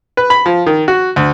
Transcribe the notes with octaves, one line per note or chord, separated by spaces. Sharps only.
B4
B5
F3
D#3
F#4
D2